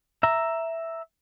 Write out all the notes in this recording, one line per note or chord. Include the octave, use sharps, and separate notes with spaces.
E5 A#5